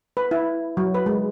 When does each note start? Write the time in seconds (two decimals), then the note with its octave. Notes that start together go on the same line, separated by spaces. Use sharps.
0.17 B4
0.31 E4
0.77 F#3
0.94 B4
1.06 G#3